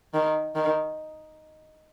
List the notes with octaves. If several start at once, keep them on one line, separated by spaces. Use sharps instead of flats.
D#3
D#3